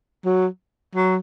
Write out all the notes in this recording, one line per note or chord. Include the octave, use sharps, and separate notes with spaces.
F#3
F#3